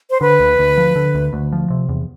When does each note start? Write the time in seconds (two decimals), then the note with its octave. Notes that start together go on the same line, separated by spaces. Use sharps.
0.10 C5
0.21 D3 B4
0.40 D2
0.59 D2
0.77 F3
0.96 D3
1.15 D2
1.33 D2
1.52 F3
1.70 C3
1.89 E2